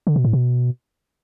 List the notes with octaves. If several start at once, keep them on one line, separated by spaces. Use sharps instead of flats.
D3
B2
A2
B2